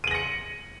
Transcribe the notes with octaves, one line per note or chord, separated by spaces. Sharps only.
A#6 C#7 D#7 F#7